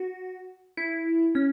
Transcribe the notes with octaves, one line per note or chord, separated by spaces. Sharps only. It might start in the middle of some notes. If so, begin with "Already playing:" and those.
Already playing: F#4
E4
C#4